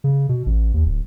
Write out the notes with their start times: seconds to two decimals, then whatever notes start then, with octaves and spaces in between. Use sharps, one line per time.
0.04 C#3
0.29 B2
0.46 A1
0.74 D#2
0.86 D1